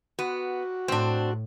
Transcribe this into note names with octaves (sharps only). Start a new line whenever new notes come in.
B3 F#4
A2 C4 D4